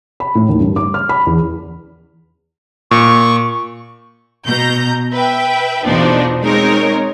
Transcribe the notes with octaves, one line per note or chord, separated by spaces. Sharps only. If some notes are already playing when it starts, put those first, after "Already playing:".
B5
A2
D#2
G2
D6
F6
B5
E2
A#2 C#6
B2 A#5 G6
B4 E5 G5
E2 B2 F3 D4 D#4
G#3 C4 D#4 A#4 C#5